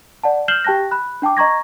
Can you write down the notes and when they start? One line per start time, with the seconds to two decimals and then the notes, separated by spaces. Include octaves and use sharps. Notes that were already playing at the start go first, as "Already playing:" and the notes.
0.24 D5 F#5 A5
0.48 F6 G6 C7 E7 F#7 G7
0.64 G4 G5 A5 F#6 A#6
0.91 B5 F#6
1.22 D4 G5 A5 D6
1.37 D#5 A#5 C#6 G#6 A#6